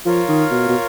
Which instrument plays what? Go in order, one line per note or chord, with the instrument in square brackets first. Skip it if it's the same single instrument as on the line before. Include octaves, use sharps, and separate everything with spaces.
[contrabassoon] F3 [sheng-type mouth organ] F4 A#4 C#5 F5
[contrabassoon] D#3
B2
B2